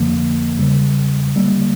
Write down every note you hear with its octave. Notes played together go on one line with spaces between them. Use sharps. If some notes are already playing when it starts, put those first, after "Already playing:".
Already playing: F2 D3 F3 A#3
E2 C#3 G3
D3 G3 A#3